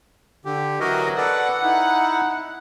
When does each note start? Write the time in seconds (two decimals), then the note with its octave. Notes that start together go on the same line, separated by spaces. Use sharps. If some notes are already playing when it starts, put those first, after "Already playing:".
0.45 D3 G4
0.80 E3 F#3 F#4 A#4 D#5
1.17 A4 B4 D5 F#5
1.63 D#4 E4